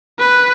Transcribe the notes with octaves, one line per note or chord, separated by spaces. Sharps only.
B4